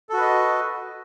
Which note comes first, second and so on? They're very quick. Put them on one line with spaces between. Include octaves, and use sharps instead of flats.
A4 F#4 B4 D#5